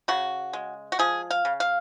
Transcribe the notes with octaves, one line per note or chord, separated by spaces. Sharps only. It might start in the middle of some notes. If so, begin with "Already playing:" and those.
C#3 F#4
G#3
F#4
F3 G#4
F5
C#3
F5